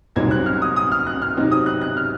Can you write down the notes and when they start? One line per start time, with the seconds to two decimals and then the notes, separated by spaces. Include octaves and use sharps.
0.16 C2 A#2 F#3 C4 D#4 G#6
0.31 F#6
0.46 F6
0.62 D#6
0.76 D#6
0.92 F6
1.07 F#6
1.22 F6
1.36 C3 F#3 C4 D#4
1.52 D#6
1.66 F#6
1.81 F#6
1.97 F6